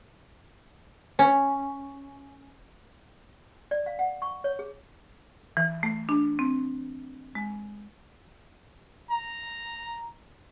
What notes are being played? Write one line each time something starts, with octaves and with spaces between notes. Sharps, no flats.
C#4
D5
F5
F#5
C#6
C#5
G#4
E3
A3
D4
C4
G#3
A#5